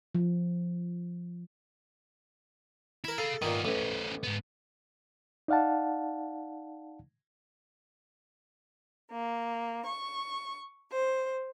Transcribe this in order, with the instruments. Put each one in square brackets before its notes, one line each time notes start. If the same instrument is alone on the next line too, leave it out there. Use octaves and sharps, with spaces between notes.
[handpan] F3
[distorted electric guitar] E4 [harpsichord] A#4 B5
[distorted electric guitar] G#4 F5 [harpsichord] A4
[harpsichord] A#2 D#3 [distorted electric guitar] B3 F4
[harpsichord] A1 [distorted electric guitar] B3 C#4
[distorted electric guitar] G#2 B3
[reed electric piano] D#4 D5 F5 F#5 A5
[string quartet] A#3
C#6
C5